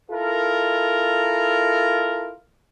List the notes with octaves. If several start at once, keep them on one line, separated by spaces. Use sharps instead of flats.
E4 F4 A4 A#4